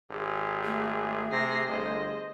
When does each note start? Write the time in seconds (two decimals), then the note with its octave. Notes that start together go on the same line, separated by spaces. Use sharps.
0.11 G#1 G4 G#4
0.64 A3
1.32 C3 A#6 C7
1.68 G1 C5 D#5